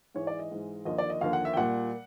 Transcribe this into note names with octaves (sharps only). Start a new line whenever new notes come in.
G#2 E3 G#3 C#5
D5
D#5
G#2 E3 G#3
D#2 D3 F3 A#3 D#5
D5
D#5
D#2 D3 F3 A#3 F5
F#5
E5
G5
A#2 G3 A#3 F#5